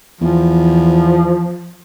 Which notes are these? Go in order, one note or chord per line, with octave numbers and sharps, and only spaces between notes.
E2 F3